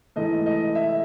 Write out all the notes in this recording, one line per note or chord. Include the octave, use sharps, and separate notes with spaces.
G#2 E3 A3 D#5
D#5
E5